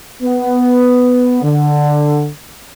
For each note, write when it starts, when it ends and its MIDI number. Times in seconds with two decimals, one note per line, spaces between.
0.22 1.40 59
1.42 2.29 50